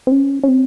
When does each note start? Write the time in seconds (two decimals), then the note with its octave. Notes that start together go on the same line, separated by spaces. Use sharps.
0.07 C4
0.12 C#4
0.43 C#4
0.48 C4